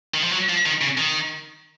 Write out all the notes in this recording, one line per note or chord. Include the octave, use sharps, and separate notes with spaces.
D#3
F3
F#3
F3
D#3
C#3
D#3